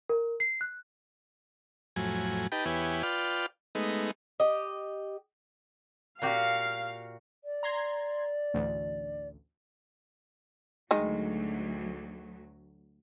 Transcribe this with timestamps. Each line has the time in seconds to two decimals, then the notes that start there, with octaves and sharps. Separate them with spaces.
0.09 A#4
0.40 C7
0.61 F#6
1.96 F2 A2 F#3 G#5
2.52 D#4 G4 B4 G5 A5
2.65 E2 B3 E4 G4 C#5 G#5
3.03 F4 B4 D5 G5 F6
3.75 G#3 A3 B3 D#4
4.40 G4 D#5
6.22 A#2 F#4 G4 F5
7.44 D5
7.63 A#5 C6 G#6
8.54 A1 D2
10.91 D2 D#3 F#3 G#3